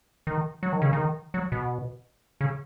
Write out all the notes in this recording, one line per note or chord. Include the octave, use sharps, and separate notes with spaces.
D#3
F#3
D#3
C#3
D#3
F#3
B2
C#3